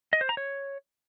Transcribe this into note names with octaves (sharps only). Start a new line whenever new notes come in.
D#5
C5
A#5
C#5